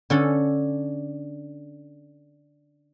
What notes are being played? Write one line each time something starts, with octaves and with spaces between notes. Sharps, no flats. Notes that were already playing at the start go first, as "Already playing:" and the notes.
D3 C#4 A4